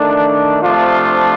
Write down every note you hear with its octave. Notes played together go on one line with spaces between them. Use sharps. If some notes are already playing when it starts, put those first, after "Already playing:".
Already playing: D#3 A3 D4
C3 F3 A3 D4 F4